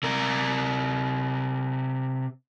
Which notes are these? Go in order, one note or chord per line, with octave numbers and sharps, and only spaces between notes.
C3 A#4